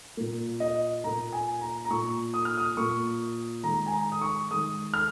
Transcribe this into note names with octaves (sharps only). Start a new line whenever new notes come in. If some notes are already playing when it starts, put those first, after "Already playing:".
A#2 A#3
D#5
A#2 A#3 A#5
G#5
A#5
A#5
A#2 A#3 C#6
D#6
F6
D#6
A#2 A#3 C#6
D#3 G#3 A#5
G#5
A#5
D#6
C#6
D#3 G#3 D#6
F6